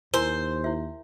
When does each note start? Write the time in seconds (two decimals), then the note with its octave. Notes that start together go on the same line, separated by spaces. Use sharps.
0.14 D#2 E4 A#4 C5 G#5
0.64 E4 E5